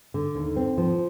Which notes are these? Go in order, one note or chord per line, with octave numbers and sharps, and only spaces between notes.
D3
D#2
C4
F3